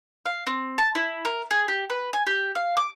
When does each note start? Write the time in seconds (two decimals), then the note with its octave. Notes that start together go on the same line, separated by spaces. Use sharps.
0.26 F5
0.47 C4
0.78 A5
0.95 E4
1.25 A#4
1.51 G#4
1.68 G4
1.90 B4
2.13 G#5
2.27 G4
2.55 F5
2.77 D6